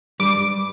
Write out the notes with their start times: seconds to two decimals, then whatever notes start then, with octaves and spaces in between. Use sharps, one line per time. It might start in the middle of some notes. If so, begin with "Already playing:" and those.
0.20 G2 G3 D6